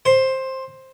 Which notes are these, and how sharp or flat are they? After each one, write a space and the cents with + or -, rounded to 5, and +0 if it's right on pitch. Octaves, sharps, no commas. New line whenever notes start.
C5 +10